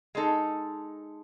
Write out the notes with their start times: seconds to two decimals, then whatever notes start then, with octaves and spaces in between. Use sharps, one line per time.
0.15 G#3 D#4 A4